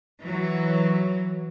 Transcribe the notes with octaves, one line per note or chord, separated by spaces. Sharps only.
E3 F#3